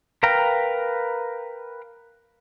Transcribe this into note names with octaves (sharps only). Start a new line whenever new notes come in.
A#4 B4 F5 G5 A#5